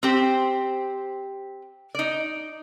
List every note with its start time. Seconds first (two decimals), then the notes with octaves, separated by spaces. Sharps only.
0.03 C4 G4 C5
1.95 D#4 D5